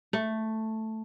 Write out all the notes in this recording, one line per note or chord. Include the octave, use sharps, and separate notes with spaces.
A3